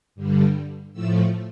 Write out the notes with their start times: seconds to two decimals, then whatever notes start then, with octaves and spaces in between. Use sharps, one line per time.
0.15 G2 D3 G3
0.93 A2 F3 A3 E6